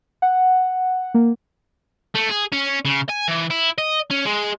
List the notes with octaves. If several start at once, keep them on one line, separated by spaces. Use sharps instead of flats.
F#5
A#3
A3
G#4
C#4
C#3
G#5
E3
E4
D#5
C#4
G#3